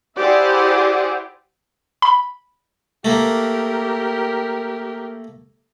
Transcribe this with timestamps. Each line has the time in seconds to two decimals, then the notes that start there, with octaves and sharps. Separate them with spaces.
0.18 E4 G4 G#4 C5 D5 F#5
2.02 B5
3.05 A3 A#3 G4 A#4